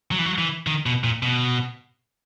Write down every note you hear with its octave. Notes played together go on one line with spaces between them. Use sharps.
F#3
E3
F#3
E3
D#3
B2
A#2
B2